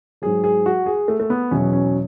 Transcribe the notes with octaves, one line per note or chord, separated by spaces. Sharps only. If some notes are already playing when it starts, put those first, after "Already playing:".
G#2 F#3 G#4
G#4
F#4
G#4
A3
A3
B3
E2 B2 F#3 C#4
C#4